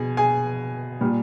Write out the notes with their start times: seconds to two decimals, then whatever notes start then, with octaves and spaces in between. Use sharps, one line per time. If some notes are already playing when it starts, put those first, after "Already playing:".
Already playing: B2 G#4 G#5
0.17 G#4 G#5
1.01 A#2 G3